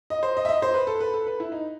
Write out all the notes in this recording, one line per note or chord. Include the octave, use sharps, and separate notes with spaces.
D#5
C5
D#5
E5
D#5
C5
B4
A4
B4
A4
B4
E4
D#4